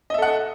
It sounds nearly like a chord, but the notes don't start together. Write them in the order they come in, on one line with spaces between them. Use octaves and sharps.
D#5 E5 A4 F#5